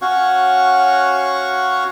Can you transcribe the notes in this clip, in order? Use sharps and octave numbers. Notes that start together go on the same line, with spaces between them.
C#4 F#4 C#5 F5 F#5 C#6